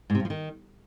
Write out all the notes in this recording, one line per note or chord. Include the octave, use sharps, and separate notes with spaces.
G#2
C3
G2
F3
D#3